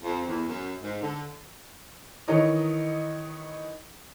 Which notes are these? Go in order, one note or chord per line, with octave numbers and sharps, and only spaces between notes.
F2
E2
F#2
G#2
D3
D#3 E3 A#4 C#5 D#5